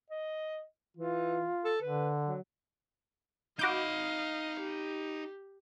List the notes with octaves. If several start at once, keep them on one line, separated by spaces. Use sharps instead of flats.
D#5
E3 F4
A4
D3 B4
F#3
D#4 F#4 D#5 F5 B5 D6 G6
G4